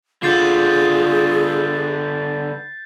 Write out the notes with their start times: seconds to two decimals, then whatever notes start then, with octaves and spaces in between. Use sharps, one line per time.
0.23 D3 B3 F4 G#4 G6 A6 C7